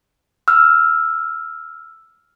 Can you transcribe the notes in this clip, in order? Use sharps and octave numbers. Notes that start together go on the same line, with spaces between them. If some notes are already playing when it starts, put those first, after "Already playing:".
E6 F6